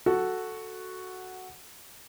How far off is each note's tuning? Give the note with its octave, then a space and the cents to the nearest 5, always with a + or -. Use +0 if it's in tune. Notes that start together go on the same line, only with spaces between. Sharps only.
F#4 +0 A4 +0